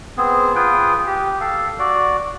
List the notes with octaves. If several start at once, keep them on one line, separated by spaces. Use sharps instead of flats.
B3 C4 G#4
F4 G#4 B4 G5
G4
A4 F5
F#4 D5